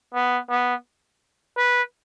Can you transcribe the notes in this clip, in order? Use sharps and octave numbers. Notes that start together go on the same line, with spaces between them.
B3
B3
B4